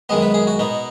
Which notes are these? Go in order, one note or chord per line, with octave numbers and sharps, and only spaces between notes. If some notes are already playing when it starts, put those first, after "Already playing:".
F#2 D#3 G#3 B3 D#5
B4
G#4
F#4
B2 B3 D#4